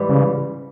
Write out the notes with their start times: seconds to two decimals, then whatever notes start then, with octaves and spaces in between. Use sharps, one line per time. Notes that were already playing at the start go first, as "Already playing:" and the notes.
Already playing: G#2 E3 G3
0.10 C#3